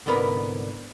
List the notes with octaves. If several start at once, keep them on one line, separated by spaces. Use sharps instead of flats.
C2 G#2 D3 B3 A#4 B4